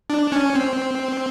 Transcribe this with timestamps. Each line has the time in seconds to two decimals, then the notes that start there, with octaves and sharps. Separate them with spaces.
0.10 D4
0.32 C#4
0.55 C4